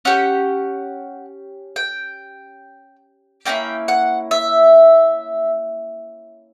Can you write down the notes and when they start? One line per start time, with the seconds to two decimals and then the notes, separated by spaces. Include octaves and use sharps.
0.05 C#4 G4 F#5
1.76 G5
3.46 A#3 C#4 E4 G5
3.88 F#5
4.31 E5